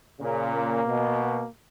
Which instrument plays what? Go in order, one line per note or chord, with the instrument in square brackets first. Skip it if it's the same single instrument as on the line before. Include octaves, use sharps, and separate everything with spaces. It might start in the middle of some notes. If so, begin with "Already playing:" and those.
[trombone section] A#2 C#3
[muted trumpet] A#3
[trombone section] B2